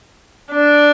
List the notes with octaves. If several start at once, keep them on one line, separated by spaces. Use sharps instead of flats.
D4